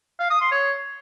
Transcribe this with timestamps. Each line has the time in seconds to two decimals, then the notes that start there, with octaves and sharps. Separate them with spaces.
0.20 F5
0.31 D#6
0.41 C6
0.52 C#5